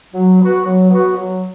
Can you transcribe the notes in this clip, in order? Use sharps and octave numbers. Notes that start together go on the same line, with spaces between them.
F#3
B3 F#4 B4
F#3
B3 F#4 B4
F#3